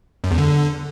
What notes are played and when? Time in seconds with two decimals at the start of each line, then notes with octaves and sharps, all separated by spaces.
0.24 F#2
0.31 E2
0.38 D3